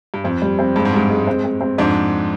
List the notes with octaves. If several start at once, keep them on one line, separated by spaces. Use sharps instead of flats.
G2
F2 C4
G3
C4
G2 G#3
G#2
G2 G#3
G#3
C4
C4
C4
F2 G#2 D4